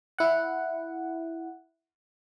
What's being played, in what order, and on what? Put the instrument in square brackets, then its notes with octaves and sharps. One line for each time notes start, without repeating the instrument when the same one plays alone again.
[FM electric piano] E4 F#5